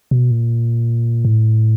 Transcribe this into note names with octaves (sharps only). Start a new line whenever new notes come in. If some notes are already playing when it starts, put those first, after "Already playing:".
B2
A#2
A2